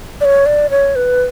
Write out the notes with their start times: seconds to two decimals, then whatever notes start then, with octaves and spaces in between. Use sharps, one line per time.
0.21 D5
0.25 C#5
0.46 D5
0.70 C#5
0.96 B4